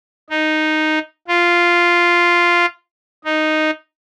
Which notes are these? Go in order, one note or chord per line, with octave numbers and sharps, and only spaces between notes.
D#4
F4
D#4